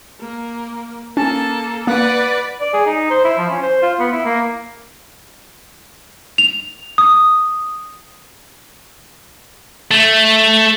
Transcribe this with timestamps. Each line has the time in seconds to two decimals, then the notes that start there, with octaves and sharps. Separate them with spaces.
0.20 A#3
1.17 A#3 C#4 A4 A5
1.87 A#3 B4 D5 F#5
2.61 D5
2.73 G#4
2.86 D#4
3.10 C5
3.24 E4
3.38 F3
3.50 C#4
3.63 C5
3.83 F4
3.99 B3
4.12 E4
4.26 A#3
6.38 F7
6.98 D#6
9.91 A3